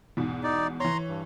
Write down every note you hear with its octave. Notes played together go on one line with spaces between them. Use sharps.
E2 G#2 B2
D#4 D5
E3 C#5 A#5 C6
G2